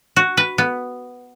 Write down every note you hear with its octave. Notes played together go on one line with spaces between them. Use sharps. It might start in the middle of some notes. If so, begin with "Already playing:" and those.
F#4
B4
B3